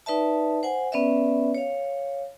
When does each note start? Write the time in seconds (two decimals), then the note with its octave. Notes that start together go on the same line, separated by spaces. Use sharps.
0.06 D#4 B4 D5 E5 A5
0.63 C5 F#5 G#5
0.92 B3 C#4 B4 D5 E5
1.55 C#5 F5